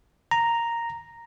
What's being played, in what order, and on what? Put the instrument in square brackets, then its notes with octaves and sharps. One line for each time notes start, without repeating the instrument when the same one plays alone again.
[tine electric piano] A#5